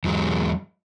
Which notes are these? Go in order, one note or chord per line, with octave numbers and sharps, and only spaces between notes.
E2 F#3 G#3